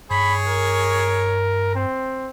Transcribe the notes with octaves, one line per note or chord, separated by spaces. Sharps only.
G2 G#4 C#5 B5
A#4
C4